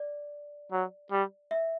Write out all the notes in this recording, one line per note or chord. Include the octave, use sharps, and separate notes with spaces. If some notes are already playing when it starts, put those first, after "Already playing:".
Already playing: D5
F#3
G3
E5